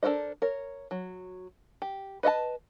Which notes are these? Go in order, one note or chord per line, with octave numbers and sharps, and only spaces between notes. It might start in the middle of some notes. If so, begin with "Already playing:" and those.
D4 A4 A#4 C5 D#5
A#4 C#5
F#3
G4
B4 D#5 E5 A5